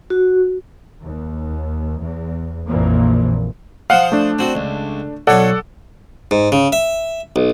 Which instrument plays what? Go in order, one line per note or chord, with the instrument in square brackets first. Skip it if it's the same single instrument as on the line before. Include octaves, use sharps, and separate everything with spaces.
[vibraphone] F#4
[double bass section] D#2
E2
A#1 F2 A#2 E3 F3 A#3
[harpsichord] F3 C5 D#6 [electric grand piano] F5 F#5
[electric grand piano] A3 D4
[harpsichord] C4 F#4
C#2
[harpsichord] B1 C#5 F5 [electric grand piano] A4 D5 F#5
[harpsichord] G#2
C#3
E5
B1